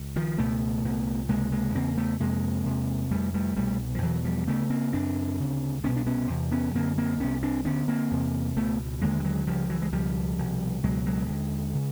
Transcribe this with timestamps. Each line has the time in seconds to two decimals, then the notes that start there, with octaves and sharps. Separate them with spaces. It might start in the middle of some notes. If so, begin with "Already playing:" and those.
Already playing: C#2
0.16 D#3 F3
0.38 C#2 B2 A3 B3
0.85 C2 A#2
1.28 C#2 C3 G#3 A#3
1.52 G#3 A#3
1.75 E2 C#3 A#3 C4
1.97 A3 B3
2.20 F2 C3 G#3 A#3
2.66 E2 C3
3.11 F2 C3 G3 A3
3.34 G3 A3
3.56 C2 B2 G3 A3
3.95 F3
4.02 E2 B2 E3 F#3
4.25 F3 G3
4.47 D2 C#3 A3 B3
4.70 A#3 C4
4.92 F#2 C#3 C4 D4
5.39 D2 C#3
5.83 C2 B2 B3 C#4
5.96 D4
6.06 B3 C#4
6.30 E2 C3
6.52 B3 C#4
6.75 F#2 D3 A#3 C4
6.98 A#3 C4
7.20 C2 C3 B3 C#4
7.43 C4 D4
7.65 D2 D3 B3 C#4
7.88 A#3 C4
8.11 E2 C3
8.57 C#2 B2 A3 B3
9.01 D#2 D3 G#3 A#3
9.20 G3
9.24 F#3 G#3
9.47 C#2 C#3 F3 G3
9.70 E3 F#3
9.82 G#3
9.93 C#2 B2 F3 G3
10.38 C2 B2
10.83 C#2 B2 F#3 G#3
11.06 F#3 G#3
11.29 D#2 D3
11.74 C#3